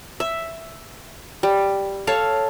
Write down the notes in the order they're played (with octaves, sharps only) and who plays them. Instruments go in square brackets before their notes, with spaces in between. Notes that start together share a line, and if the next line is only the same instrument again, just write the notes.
[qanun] E5
G3
A4 C#5 F5